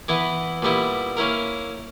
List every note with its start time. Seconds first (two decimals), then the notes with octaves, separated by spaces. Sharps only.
0.08 E3 B3 E4
0.62 A#2 G3 B3 E4
1.17 A#3 C#4 E4 A#4